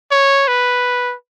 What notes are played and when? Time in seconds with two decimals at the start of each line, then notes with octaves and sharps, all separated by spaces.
0.11 C#5
0.48 B4